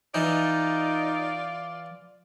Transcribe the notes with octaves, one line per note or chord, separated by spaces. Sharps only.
E3 D#4 F4 D5